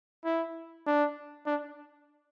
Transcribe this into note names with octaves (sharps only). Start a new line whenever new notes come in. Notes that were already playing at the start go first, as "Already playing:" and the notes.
E4
D4
D4